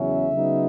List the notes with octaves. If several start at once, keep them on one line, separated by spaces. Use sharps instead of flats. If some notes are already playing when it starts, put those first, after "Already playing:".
Already playing: E2 C#3 F#3 C#4 E5
C#3 F#3 B3 D#4